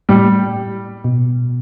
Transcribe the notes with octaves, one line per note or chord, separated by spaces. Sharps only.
A2 G3
B2